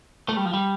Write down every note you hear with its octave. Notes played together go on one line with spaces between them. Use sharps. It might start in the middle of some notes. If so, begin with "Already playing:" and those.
A3
G3
F3
G3